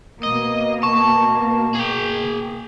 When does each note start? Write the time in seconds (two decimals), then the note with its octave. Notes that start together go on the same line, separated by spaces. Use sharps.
0.23 B2 A#3 D#5
0.83 A5 C#6
1.75 G#4 G5